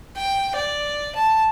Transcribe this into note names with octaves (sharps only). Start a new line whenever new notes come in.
G5
D5
A5